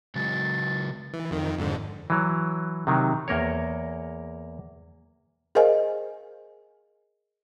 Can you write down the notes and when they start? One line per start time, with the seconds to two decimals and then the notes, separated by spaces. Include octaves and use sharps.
0.16 C#3 F#3 G#3 A6
1.14 E3
1.31 F2 D#3
1.59 F2 G#2 D3
2.10 E3 F#3
2.87 C3 D#3 F#3
3.28 E2 A#3 A#4 C#5
5.55 G#4 A#4 C5 D#5 F5 G#5